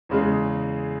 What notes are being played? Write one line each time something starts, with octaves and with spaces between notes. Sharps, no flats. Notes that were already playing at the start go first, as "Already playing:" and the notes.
E2 C#3 G#3